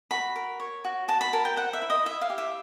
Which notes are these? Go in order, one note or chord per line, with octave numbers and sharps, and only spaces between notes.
F#4 B5
A#4
C#5
F#4
F#4 A5
B5
A#4 A5
G5
C5 F#5
E5
E4
D#5
E4 E5
F5
G4
E5